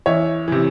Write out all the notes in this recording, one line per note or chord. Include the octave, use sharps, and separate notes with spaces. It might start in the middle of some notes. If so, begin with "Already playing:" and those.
E2 C#5 E5
C3 E3